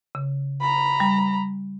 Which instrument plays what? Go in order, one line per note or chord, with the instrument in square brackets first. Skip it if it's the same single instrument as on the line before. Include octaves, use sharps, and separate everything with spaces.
[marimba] C#3
[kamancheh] A#5 B5
[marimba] G3